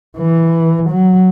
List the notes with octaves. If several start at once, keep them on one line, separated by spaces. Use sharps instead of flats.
E3
F#3